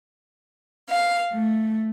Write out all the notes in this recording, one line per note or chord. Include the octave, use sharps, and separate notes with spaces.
F5
A3